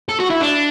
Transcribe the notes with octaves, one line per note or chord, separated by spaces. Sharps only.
A4
F#4
E4
D4